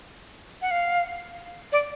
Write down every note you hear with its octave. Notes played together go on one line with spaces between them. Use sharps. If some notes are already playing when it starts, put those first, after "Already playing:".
F#5
F5
D5